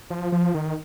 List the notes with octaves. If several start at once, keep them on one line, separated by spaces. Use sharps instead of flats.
F3
F3
D#3